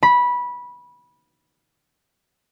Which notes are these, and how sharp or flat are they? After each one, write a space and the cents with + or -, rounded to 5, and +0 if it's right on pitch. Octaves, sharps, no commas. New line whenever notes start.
B5 -15